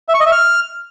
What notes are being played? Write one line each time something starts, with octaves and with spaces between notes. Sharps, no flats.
E5
C#6
D#5
E5
F6